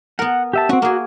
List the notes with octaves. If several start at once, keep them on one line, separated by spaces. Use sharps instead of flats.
B3 A#4 F#5
G4 E5 A5
C4 C#4 F#4
A#3 F#4 G#4